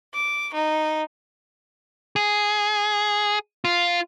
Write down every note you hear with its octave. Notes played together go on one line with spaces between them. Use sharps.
D6
D#4
G#4
F4